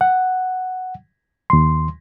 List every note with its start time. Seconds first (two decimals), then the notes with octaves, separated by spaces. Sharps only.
0.01 F#5
1.50 D#2 C6